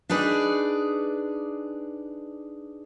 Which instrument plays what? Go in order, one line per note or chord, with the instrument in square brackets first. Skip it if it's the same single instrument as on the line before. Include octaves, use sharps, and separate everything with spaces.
[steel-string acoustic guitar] D4 D#4 G#4 B4 D5